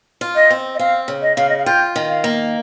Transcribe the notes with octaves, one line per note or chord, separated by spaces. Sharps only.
F4
D#5
C4
D#5
C4 F5
C#3
D#5
C#3 F5
D#5
F5
F4 G5
D#3
F5
A#3